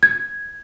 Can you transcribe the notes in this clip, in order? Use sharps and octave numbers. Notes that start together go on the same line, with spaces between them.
G#6